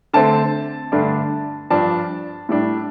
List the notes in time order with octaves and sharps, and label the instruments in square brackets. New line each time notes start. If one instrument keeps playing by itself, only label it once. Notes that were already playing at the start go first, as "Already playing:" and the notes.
[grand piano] D3 A3 C4 A5
G2 D3 A3 D4
G2 F3 D4 A5
A2 G3 D4